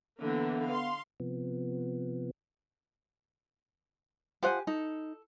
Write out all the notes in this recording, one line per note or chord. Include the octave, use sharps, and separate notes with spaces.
D3 E3 A#3 B3
F5 C6
C3 F3 B3
F3 G4 C5 F#5 G#5
D#4 A4